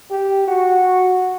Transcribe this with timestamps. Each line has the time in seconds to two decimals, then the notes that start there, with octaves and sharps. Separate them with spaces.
0.11 G4
0.48 F#4